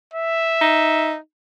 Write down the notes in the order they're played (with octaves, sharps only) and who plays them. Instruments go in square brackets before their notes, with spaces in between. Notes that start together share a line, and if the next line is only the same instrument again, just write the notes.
[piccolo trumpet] E5
[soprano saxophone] D#4